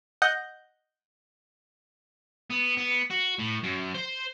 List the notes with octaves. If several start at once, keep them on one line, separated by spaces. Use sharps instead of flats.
D#5 F#5 G6 A#6
B3
B3
F#4
A2
F#2
C5